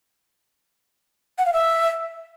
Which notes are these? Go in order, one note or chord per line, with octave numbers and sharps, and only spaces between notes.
F#5
F5
E5